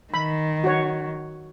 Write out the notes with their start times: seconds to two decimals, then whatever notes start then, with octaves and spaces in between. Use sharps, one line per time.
0.14 D#3 B5
0.64 F#4 C#5